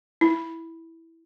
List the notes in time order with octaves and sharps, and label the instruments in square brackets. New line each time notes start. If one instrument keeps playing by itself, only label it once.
[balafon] E4